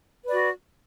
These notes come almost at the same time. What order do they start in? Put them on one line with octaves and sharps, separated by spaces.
B4 D5 F#4